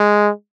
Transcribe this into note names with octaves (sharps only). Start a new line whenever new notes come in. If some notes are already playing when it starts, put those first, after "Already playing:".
Already playing: G#3